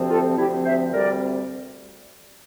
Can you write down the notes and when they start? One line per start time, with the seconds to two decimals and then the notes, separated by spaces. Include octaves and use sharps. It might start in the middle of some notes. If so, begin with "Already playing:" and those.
Already playing: D2 C3 F3 C4
0.10 F4 A4
0.37 D2 C3 F3 C4 E4 G4
0.65 C5 E5
0.93 D2 C3 G3 C4 A#4 D5